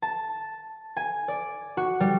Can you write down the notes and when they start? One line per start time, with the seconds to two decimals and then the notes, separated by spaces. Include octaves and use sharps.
0.02 A5
0.97 G#5
1.28 D5
1.77 F#4
2.00 G3